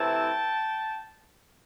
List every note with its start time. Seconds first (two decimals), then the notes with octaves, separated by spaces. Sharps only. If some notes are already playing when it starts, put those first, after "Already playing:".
Already playing: C3 E3 A3 C4 E4 G5 A5